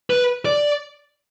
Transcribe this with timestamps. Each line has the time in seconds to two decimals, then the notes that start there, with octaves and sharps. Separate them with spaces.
0.10 B4
0.45 D5